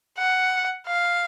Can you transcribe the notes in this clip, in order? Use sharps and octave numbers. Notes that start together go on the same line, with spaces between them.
F#5
F5